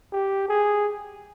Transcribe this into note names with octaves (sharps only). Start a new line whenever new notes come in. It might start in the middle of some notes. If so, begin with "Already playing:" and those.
G4
G#4